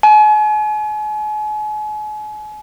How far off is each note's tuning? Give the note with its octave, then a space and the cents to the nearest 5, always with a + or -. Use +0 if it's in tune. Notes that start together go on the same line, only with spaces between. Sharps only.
G#5 +40